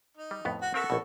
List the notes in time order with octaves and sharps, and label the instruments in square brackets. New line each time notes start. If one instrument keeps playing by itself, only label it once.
[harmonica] D#4
[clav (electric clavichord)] G3
F2 A2 B3
[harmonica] F#4
[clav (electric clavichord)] C4 A#4 E5 [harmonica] F#4 A4 C#6
[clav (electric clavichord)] A#1 B2